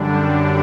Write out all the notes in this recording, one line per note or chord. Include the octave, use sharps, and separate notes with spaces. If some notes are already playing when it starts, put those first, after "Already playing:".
Already playing: F#2 D3 G3 D4